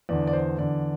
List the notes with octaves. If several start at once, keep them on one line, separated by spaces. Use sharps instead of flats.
E2 D3 D5
D5
C5
E2 D3 D5